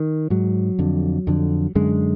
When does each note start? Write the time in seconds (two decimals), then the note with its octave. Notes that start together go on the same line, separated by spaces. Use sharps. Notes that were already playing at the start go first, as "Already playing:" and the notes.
Already playing: D#3
0.30 G#2 F#3
0.79 F2 D3
1.27 F2 D3
1.75 F#2 D3 G#3